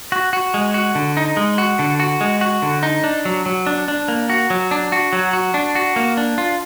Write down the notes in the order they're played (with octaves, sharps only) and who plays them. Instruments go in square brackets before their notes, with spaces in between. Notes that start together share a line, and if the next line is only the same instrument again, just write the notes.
[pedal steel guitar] F#4
F#4
G#3
F#4
D3
D#4
G#3
F#4
D3
F#4
G#3
F#4
D3
D#4
D4
F#3
F#3
D4
D4
A#3
F#4
F#3
D4
F#4
F#3
F#4
D4
F#4
A#3
D4
F4